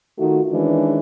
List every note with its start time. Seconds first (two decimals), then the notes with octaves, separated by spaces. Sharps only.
0.19 D#3 A3 D#4 F4 F#4
0.52 D#3 E3 G#3 C#4 D4